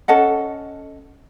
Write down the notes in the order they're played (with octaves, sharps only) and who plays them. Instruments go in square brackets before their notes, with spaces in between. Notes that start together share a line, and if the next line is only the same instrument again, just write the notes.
[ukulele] C#4 A4 D#5 F#5